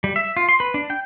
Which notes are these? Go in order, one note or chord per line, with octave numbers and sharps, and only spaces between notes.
G3
E5
F4
C6
B4
D4
G5